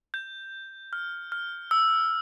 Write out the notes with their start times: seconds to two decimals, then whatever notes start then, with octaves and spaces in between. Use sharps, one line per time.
0.14 G6
0.93 F6
1.32 F6
1.71 E6